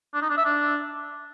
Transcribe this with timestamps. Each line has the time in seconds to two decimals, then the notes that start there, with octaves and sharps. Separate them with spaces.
0.14 D4
0.22 D#4
0.30 D4
0.37 E5
0.45 D4